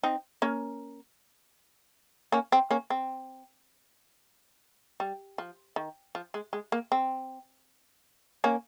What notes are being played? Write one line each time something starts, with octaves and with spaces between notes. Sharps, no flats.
C4 D#4
A#3 C#4
A#3 C#4
C4
A#3 C#4
C4
G3
F3
D#3
F3
G#3
G#3
A#3
C4
A#3 C#4